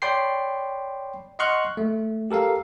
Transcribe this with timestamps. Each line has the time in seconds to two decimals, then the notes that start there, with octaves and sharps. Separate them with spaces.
0.02 C#5 D5 G5 B5 C6 C7
1.39 D#5 F#5 C6 C#6 F6 F#6
1.77 A3
2.31 G4 A4 A#4 F5